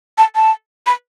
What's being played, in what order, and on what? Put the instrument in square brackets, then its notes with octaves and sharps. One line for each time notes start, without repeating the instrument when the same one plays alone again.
[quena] A5
A5
B5